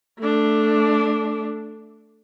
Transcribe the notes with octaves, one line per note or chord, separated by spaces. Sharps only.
A3 D4